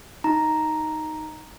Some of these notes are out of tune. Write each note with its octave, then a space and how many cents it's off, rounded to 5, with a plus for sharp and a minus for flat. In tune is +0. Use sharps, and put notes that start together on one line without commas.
D#4 +0 A#5 +0